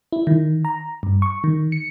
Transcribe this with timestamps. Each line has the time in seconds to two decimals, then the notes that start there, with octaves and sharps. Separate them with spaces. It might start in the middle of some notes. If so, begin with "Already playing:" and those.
0.12 E4
0.27 D#3
0.65 A#5
1.03 G2
1.22 C#6
1.44 D#3
1.72 C#7